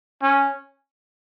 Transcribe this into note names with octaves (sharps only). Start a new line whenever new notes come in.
C#4